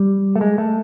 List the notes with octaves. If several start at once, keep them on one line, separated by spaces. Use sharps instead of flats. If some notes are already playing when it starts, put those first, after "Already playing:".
Already playing: G3
A3
G#3
A3